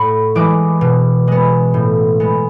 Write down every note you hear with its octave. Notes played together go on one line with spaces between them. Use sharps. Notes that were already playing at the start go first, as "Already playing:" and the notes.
Already playing: A2 F#5 B5 C#6
E3 G#3 D6
B2
G#3 B3
A2
G#3 B3